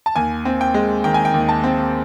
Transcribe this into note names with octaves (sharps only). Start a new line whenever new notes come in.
A5
D#2 G#5
C4
G5
G#3
D#3 G5
G#5
G5
D#2
A5
C4